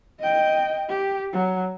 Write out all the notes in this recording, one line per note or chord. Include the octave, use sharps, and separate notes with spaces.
D#5 G5
G4
F#3